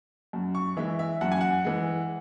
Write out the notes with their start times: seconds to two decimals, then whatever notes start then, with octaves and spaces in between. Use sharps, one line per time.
0.33 F#2
0.55 C#6
0.77 E3 G#3 E5
0.99 E5
1.21 F#2 F#5
1.32 G#5
1.41 F#5
1.65 E3 G#3